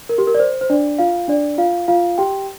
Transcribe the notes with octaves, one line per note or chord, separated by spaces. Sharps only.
A#4
G4
A#4
D5
C5
C5
D4 D5
F4 F5
D4 D5
F4 F5
F4 F5
G4 G5